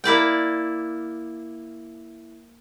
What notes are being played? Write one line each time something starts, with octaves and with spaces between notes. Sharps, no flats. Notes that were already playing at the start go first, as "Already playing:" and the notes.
A#3 E4 D5 G5